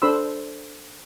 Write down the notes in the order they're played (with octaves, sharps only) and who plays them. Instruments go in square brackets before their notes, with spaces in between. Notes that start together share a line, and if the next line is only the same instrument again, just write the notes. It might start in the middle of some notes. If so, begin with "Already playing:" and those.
[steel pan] D4 A4 C5 B5 C6 E6